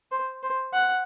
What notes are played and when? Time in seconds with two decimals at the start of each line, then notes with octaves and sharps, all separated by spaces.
0.12 C5
0.43 C5
0.73 F#5